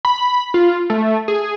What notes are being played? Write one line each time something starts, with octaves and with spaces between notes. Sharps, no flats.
B5
F4
A3
G#4